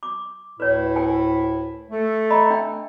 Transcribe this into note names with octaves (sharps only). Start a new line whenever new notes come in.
D6
D2 A2 E4 B4 C#5
A#4 G5 G#5
A3 A4
D#5 A#5 B5
D4 E5 G5